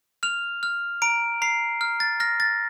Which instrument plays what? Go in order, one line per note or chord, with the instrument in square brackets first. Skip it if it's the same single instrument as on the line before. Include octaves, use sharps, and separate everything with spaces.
[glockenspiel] F6 F7
F6
A#5 D7
A#5 C7
F6
A6
F6 A#6
A6